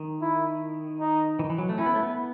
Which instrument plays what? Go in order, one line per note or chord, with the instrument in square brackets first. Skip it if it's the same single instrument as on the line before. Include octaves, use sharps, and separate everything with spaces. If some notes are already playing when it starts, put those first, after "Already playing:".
Already playing: [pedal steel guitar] D#3
[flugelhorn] E4
D#4
[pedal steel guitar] E3
D#3
E3
F#3
A3
[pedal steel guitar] C#4 [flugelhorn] E4
[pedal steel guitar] B3
A3
B3